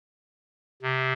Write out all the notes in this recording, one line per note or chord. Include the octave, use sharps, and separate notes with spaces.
C3